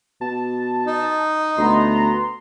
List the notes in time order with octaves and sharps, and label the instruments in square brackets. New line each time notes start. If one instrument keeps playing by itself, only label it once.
[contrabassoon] B2 [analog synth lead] A5
[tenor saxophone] D#4
[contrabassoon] D2 [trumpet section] B3 A#5 [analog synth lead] C6